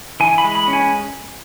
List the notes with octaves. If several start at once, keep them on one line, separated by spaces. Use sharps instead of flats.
E3 G#5
B5
G#3
B5
C#4
G#5